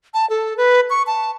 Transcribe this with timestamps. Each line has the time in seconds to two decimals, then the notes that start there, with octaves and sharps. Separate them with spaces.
0.14 A5
0.30 A4
0.57 B4
0.90 C#6
1.07 A5